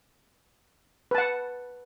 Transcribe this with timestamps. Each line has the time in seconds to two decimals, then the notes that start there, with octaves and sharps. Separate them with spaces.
1.11 B4
1.15 A5
1.18 F#5